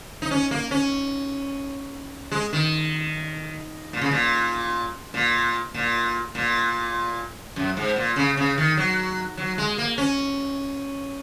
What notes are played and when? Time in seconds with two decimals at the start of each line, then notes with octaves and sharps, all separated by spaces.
0.22 D#4
0.31 C#4
0.51 A#3
0.71 C#4
2.32 G#3
2.53 D#3
3.93 A#2
4.02 C#3
4.11 A#2
5.14 A#2
5.74 A#2
6.35 A#2
7.56 F#2
7.77 G#2
7.96 A#2
8.16 C#3
8.37 C#3
8.58 D#3
8.77 F#3
9.37 F#3
9.58 G#3
9.78 A#3
9.98 C#4